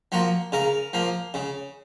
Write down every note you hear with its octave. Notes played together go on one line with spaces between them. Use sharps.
F3 A#3 F#4
C#3 A#4
F3 A#3
C#3